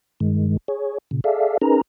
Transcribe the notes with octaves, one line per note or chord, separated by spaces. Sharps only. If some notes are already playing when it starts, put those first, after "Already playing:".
G2 D#3 G#3
G#4 C#5
A#2 C#3
G#4 A4 D5 E5 F5
C#4 D#4 G#4 A#4 B4 A#5